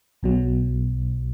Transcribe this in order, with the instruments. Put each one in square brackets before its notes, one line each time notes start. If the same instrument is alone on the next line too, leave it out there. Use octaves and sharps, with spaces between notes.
[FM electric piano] B1 B2 F#3